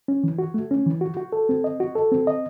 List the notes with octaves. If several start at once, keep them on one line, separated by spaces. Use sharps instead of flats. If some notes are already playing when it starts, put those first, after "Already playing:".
C#4
E3
F#4
A3
C#4
E3
F#4
F#4
A4
C4
D#5
F#4
A4
C4
D#5